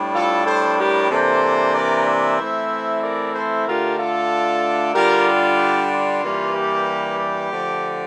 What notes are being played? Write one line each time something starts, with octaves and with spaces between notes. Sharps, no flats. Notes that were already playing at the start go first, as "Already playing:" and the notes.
Already playing: A2 G3 D4
F4 A4
A4 C5
G4 A#4
C3 E3 A#3 D4 A4 C5
A#4 D5
C5 E5
E3 A3 C4 E4
A#4 D5
A4 C5
D3 A3 D4 F4 G4 A#4
F4 A4
D3 G3 D4 F4 G4 A#4
G4
F4
G2 E3 G3 A#3
G4
G4
D3 F3 A3